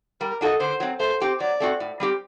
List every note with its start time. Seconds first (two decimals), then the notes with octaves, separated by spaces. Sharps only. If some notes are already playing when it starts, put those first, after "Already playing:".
0.21 G3 A#4
0.41 D4 F#4 A4 D#5
0.60 D3 C5
0.80 F#3 C4
1.00 A3 C5
1.20 C4 G4 C5
1.40 F#3 D5
1.60 A3 C4 F#4
1.80 A2
2.00 G3 C4 G4